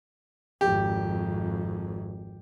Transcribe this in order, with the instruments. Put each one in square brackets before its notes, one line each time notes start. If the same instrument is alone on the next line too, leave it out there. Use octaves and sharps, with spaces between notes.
[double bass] G#1 F2 [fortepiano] G4